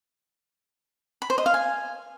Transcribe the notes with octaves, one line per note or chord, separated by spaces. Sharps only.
B5
C5
D#5
F5
G#5